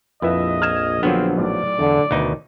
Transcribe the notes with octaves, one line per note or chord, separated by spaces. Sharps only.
A#1 F2 E4 B4 D#5 E5
F6 G#6 E7
D3 F3 F#3 B3 C4
B1 A2 D5
E2 D3
D2 B2 D#3 D#4